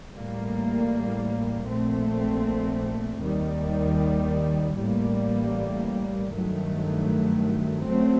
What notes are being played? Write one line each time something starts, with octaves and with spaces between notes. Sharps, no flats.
A1 A2 G3 A#3
A#1 A#2 A3 C4
D#2 D#3 G3
A1 A2 G3 A#3
G2 D#3 F#3 A3
F#2 F#3 A3 C4